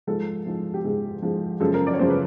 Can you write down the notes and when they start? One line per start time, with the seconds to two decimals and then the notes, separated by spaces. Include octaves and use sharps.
0.07 G#2 F3 G#3 A4
0.46 G#2 F3 G#3
0.74 G4
0.84 G#2 F3 G#3 G#4
1.22 G#2 F3 G#3
1.60 F#2 C#3 F3 G#3 A4
1.74 A#4
1.87 D5
1.94 C#5
1.99 F#2 C#3 F3 G#3 C5
2.10 B4